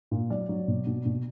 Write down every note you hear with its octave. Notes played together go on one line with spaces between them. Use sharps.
A#2
F#3 D5
F#3
B2
B2
B2